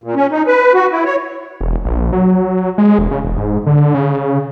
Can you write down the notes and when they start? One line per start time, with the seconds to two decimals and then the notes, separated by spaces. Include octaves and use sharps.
0.04 A#2
0.15 C#4
0.31 D#4
0.46 B4
0.74 F#4
0.91 E4
1.05 C#5
1.61 E1
1.85 A#1
2.13 F#3
2.78 G#3
2.99 E1
3.11 C#3
3.24 E1
3.37 G#2
3.67 D3
3.94 C#3